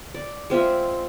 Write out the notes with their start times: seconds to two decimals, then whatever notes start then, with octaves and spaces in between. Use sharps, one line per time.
0.14 D5
0.50 G#3 C4 F4 E5